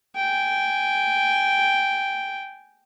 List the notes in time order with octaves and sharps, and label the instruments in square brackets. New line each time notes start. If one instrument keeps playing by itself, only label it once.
[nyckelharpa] G5 G#5